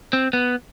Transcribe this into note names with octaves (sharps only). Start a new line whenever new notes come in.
C4
B3